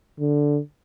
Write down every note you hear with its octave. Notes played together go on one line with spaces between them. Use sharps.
D3